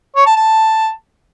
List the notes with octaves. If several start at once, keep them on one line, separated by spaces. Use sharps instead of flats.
C#5
A5
A5